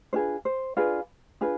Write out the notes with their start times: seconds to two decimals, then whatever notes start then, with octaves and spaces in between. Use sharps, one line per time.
0.13 D4 F4 G#4 B4 C5
0.45 C5
0.77 D4 F4 G#4 B4
1.41 D4 F4 G#4 B4